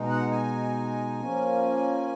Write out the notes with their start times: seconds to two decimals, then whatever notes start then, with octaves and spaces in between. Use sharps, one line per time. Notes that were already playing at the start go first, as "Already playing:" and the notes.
Already playing: B2 G#3 D#4
0.09 F#5
0.31 G#5
1.20 F3 A#3 C#4